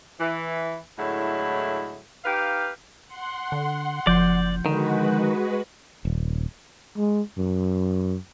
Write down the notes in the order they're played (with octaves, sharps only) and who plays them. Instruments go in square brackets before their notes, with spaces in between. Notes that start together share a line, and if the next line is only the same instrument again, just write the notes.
[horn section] E3
A2 D3 F#3 G#3 E4
D#4 G4 B4 F5
[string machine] F#5 C6
[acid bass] D3
[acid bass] F#1 [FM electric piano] F3 G6 [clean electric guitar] D5
[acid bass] D3 [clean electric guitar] D#3 [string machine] G#3 F#4 B4
[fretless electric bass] D#1
[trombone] G#3
F#2